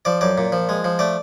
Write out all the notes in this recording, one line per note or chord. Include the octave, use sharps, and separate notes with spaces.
F3 D5
F#2 D5
A#2
F3
G#3
F3
A3 D5